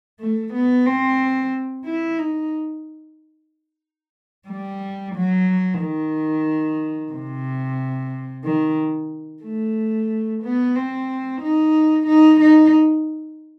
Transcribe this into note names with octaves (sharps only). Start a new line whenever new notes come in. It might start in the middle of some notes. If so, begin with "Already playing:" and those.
A3
B3
C4
E4
D#4
G3
F#3
D#3
C3
D#3
A3
B3
C4
D#4
D#4
D#4